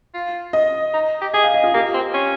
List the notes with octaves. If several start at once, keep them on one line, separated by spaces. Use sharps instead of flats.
F4
D#5
D#4
G4
G#4 D#5
F5
D#5
F4
A#3 G4
C4
C#4